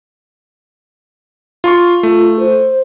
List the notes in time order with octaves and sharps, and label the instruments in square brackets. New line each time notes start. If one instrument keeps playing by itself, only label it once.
[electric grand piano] F4 C6 C#6
[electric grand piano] A3 [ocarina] F4
[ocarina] C5